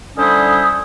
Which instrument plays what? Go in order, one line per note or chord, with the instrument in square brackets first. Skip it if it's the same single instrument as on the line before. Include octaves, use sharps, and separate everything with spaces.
[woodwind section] D3 G3 C#4 E4 C5 D#6